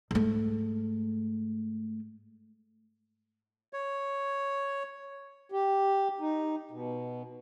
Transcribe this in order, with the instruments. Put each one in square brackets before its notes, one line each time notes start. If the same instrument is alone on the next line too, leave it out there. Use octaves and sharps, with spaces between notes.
[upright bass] G#2 A3
[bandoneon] C#5
[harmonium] G4
D#4
B2